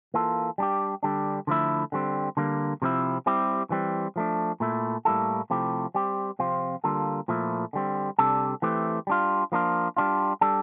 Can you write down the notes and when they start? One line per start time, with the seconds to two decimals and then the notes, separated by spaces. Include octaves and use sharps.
0.14 E3 A#3 F4 A4
0.58 G3 D4 G4
1.03 D3 G3 D4
1.47 D3 F3 A3 E4
1.92 D3 G3 C4
2.37 D3 G3 A#3
2.82 C3 F3 C4 E4
3.26 G3 C4 E4 G4
3.70 E3 G3 C4
4.16 F3 A3 D4
4.60 A#2 A3 E4
5.05 A2 G3 A#3 E4 A4
5.50 C3 F3 A3 E4 G4
5.95 G3 C4 G4
6.39 C3 F3 C4 F4
6.84 D3 G3 A#3 F4 A4
7.28 A#2 F3 A3 E4
7.73 D3 G3 C4
8.19 C3 G3 D4 A4
8.62 E3 A3 C4 G4
9.07 G3 D4 F4
9.52 F3 A#3 D4 F4
9.97 G3 D4 F4
10.41 G3 D4 A4